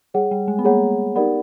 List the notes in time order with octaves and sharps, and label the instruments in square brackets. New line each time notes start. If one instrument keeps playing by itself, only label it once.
[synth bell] G3 [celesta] G#4 C#5 F#5
[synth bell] G3
G#3
B3
[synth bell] A#3 [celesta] G#4 C#5 F#5
[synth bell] B3 [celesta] D#4 G4 A#4 D5 F#5